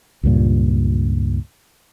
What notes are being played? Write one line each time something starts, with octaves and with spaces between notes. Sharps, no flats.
C#2 G2 A#2